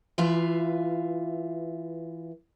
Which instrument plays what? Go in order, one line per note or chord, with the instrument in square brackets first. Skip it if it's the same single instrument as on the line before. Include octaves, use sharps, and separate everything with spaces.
[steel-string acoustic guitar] E3 F4 B4 E5 F5